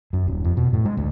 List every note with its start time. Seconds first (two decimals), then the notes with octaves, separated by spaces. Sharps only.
0.13 F#2
0.28 D#1
0.44 F2
0.57 B2
0.73 A2
0.85 G#3
0.97 D2